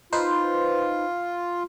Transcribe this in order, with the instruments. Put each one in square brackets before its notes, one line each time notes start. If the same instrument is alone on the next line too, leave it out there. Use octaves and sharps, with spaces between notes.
[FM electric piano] D#4 B4 C5 [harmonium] F4